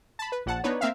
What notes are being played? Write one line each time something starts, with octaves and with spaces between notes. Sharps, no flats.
A5 B5
B4
A#1 F#5 A5
B3 D4 D#4 B4 C#5
A#3 C4 E5 F5